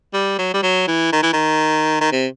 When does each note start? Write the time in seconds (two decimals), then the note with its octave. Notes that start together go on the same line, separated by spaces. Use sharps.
0.13 G3
0.38 F#3
0.54 G3
0.63 F#3
0.87 E3
1.13 D#3
1.23 E3
1.33 D#3
2.00 D#3
2.12 C3